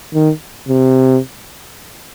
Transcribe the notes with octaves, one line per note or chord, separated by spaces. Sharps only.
D#3
C3